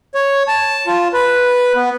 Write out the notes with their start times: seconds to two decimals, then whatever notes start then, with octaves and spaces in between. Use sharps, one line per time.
0.15 C#5
0.48 A5
0.87 F4
1.14 B4
1.75 B3